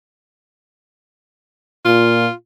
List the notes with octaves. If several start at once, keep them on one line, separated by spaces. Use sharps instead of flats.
A#2 F4